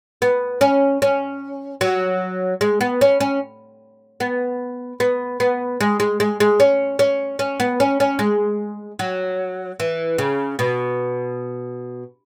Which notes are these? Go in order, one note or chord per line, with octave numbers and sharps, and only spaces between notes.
B3
C#4
C#4
F#3
G#3
B3
C#4
C#4
B3
B3
B3
G#3
G#3
G#3
G#3
C#4
C#4
C#4
B3
C#4
C#4
G#3
F#3
E3
C#3
B2